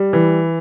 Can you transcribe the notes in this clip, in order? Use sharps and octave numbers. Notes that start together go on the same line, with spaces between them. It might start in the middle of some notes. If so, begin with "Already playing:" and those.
Already playing: G3
E3